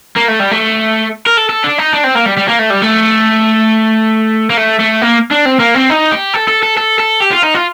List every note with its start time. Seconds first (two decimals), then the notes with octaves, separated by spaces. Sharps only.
0.17 A#3
0.29 A3
0.40 G3
0.51 A3
1.27 A#4
1.38 A4
1.50 A4
1.64 D4
1.78 D#4
1.93 D4
2.04 C4
2.15 A#3
2.26 G3
2.37 G3
2.48 A#3
2.59 A3
2.70 G3
2.81 A3
4.50 A#3
4.57 A3
4.79 A3
5.01 A#3
5.31 D4
5.45 C4
5.60 A#3
5.75 C4
5.90 D#4
6.12 G4
6.34 A4
6.48 A4
6.63 A4
6.78 A4
7.00 A4
7.22 G4
7.32 F4
7.44 D#4
7.55 F4